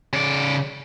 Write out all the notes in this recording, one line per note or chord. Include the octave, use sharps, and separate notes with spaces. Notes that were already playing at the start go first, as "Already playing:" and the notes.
C#3 D5